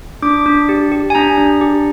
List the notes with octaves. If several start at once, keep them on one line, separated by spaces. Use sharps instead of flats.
D4 D6
D4
G4
G4
G#5
D4 A#5
D4
G4